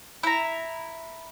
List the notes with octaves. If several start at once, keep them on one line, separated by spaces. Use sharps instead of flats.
E4 A#5